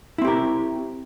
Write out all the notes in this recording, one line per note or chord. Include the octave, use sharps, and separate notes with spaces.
C4 E4 G4 A#4